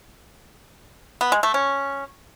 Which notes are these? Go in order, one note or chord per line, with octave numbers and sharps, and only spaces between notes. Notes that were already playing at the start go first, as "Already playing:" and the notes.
B3
G#3
A3
C#4